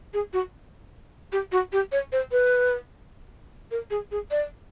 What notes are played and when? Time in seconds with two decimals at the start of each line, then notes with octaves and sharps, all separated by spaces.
0.14 G#4
0.33 F#4
1.32 G4
1.52 F#4
1.73 G4
1.92 C#5
2.12 C5
2.32 B4
3.71 A#4
3.90 G#4
4.11 G#4
4.31 D5